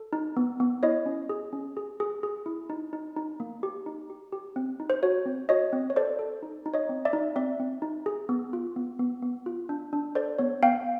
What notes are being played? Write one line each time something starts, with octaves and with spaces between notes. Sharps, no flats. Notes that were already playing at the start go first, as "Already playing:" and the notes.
Already playing: A4
D#4
B3
B3
E4 C#5 D#5
C#4
G#4
C#4
G#4
G#4
G#4
E4
D#4
D#4
D#4
A#3
G4
D#4
G4
G4
C4
D#4
C5
F#4 C#5
C4
F#4 C#5 D#5
C4
C#5
A4 C5 D5
A4
D#4
D#4
C#5 D#5
C4
D5 E5
D#4
C4 D5 E5
C4
D#4
G#4
B3
F4
B3
B3
B3
F4
D4
D4
A4 C5 D5
B3 C#5
B3 F5 G5